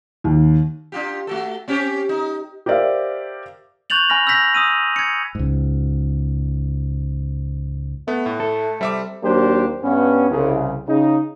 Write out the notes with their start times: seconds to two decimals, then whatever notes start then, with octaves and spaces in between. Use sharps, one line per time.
0.24 D#2
0.92 D4 F4 G4
1.27 A3 F#4 A4
1.68 C4 C#4 G4
2.09 D#4
2.66 G4 A#4 C5 D5 E5 F5
3.90 C#6 F#6 G6 A6 F7 F#7
4.10 G#5 B5 F6 A#6
4.27 E6 F6 G6 A#6 B6
4.54 D#6 E6 D#7
4.96 G#6 C#7
5.35 C#2 G#2
8.08 A3 B3
8.26 A2
8.40 A4
8.81 C3 G3 E5 D6
9.23 D#2 F#3 A#3 D4 G4 C5
9.82 G2 B3 C#4
10.30 C2 C#3
10.87 C#3 D#4